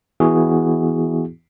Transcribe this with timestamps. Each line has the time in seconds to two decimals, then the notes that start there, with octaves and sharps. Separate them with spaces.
0.20 E3 B3 E4 F#4 G#4